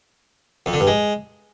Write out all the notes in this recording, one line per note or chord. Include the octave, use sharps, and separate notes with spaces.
F2
D3
G2
G#3